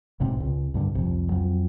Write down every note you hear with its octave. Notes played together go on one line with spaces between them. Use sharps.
B1 G#2 C3
C#2
C2 G2 D3
C2 F2
F2 F#3